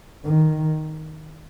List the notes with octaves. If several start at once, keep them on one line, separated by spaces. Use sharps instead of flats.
D#3